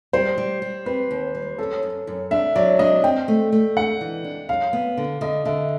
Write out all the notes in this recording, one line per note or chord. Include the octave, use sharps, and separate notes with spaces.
G3 C5
G3
G3
C4 B4
D#2
G3
C#4 A4
F#2
F#2
D4 E5
F#3 D5
D4 D#5
C4 G5
A3
A3
D4 F#5
E3
D4
F#2 F5
B3
D3
D3 D#5
D3 E5